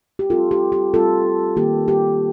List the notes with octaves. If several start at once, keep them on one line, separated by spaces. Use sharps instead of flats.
G4
G3 C4 F4 A4
G4
G4
G3 C4 F4 A4
D#3 A#3 F4 G4
G4